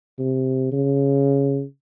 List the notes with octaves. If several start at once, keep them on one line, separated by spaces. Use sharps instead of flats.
C3
C#3